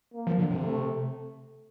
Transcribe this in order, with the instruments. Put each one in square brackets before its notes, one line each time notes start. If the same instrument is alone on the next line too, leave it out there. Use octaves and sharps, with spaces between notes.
[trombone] A#3
[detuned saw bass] F3
D3
C3
[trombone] A3